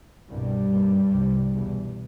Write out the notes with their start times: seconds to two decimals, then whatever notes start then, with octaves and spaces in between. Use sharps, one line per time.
0.29 C2 G2 B2 G3
0.71 D#2
1.12 C2 C3
1.54 E2 B2